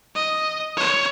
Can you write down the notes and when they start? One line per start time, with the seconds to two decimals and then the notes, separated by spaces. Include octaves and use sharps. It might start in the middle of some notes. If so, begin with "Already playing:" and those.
0.15 D#5
0.77 C#5